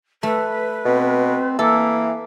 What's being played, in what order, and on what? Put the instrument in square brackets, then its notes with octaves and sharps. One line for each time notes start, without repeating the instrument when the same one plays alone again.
[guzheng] A3 [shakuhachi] B4
[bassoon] B2 [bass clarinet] C4
[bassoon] E3 [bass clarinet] A#3 [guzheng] A4